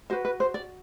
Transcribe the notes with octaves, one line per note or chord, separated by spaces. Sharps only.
F#4 B4 C5
B4
C5
D5